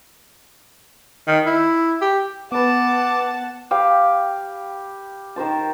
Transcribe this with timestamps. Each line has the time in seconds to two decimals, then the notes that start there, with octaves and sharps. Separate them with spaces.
1.27 D#3
1.46 E4
2.01 G4
2.52 B3 B4 F#5 A5 D6 A6
3.71 G4 F5 G5 B5
5.36 D#3 A#4 C5 A5